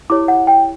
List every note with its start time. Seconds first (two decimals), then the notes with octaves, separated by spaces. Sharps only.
0.10 E4 G4 C#5 D6
0.28 F#5
0.47 G5